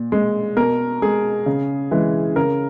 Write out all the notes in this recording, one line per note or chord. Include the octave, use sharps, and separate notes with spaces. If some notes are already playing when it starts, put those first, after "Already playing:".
Already playing: A#2
G#3
B2 A#4
G#3 G#4
C#3
E3 G#3
C#3 A#4